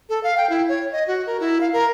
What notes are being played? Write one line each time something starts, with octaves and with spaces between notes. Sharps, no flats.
A4
F5
G5
E4
C#5
D#5
F#4
A#4
E4
F5
A#4